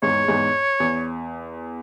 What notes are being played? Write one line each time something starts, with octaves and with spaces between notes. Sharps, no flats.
E2 G#2 C#5
E2 G#2
E2